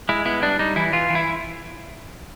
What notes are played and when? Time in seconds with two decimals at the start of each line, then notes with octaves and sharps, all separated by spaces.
0.09 G#3 E4
0.26 B3 E4
0.42 G3 D4
0.59 G3 D#4
0.76 E3 E4
0.93 E3 F4
1.10 E3
1.15 E4